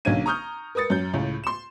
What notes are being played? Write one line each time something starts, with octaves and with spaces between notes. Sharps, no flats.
B1 D3 A#3 C#4 G#6 D#7
A#5 C#6 D#6 F6 G6
A#4 B4 D#6 A6 C#7
F#2 G6
C#2 A2
C6 E7